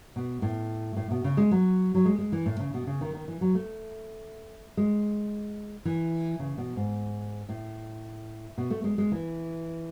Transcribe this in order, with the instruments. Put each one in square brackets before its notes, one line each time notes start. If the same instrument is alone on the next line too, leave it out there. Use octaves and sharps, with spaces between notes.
[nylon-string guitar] B2
A2
A2
B2
C#3
G#3
F#3
F#3
G#3
G#3
E3
A2
C#3
B2
C#3
D#3
D#3
E3
F#3
A3
G#3
E3
C#3
B2
G#2
A2
B2
A3
G#3
G#3
E3